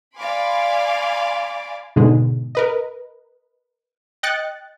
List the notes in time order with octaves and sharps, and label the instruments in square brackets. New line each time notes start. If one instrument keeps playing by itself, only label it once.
[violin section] D5 F5 G#5 B5 C6 D6
[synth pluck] G#2 B2 D3 G#3
A#4 B4 D#5
D#5 G5 F#6 A6 C#7